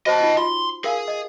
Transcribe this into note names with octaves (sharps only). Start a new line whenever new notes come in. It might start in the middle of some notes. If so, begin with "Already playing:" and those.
F#4 C5 D#5 A5
D#4 F4
F4 C6
G#4 A#4 F5 G#5
D#5